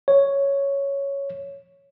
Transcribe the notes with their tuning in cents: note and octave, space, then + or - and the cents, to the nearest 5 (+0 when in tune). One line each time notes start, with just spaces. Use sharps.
C#5 +5